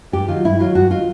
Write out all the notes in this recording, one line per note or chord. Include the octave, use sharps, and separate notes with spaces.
G2 G4
D#3 F#3 F4
G2 E4
D#3 F#3 F4
G2 F#4
D#3 F#3 F4